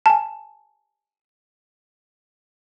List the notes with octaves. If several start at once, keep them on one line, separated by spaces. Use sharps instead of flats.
G#5 A5